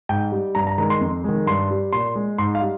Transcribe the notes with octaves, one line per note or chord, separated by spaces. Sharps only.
G#2 G5
G3
G2 A#5
A#5
D#3 G#3 A#5
C6
F2
D#3 G#3
G2 C6
G3
A#2 C6
G#3
G#2 C6
F5
G3